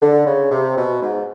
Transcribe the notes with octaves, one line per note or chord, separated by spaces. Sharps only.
D3
C#3
C3
B2
G#2